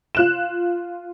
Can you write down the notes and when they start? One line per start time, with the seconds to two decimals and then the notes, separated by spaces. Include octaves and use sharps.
0.15 F4 F#6 E7